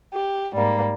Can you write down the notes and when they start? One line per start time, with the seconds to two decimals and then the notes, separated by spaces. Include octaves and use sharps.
0.12 G4
0.52 G#2 G3 A#3